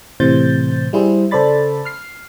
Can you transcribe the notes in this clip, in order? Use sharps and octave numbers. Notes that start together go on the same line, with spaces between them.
A2 C3 E3 C5 G6 A6
G3 E4 G#4 C5
C#3 A4 C5 D5 B5 A6
F6 C7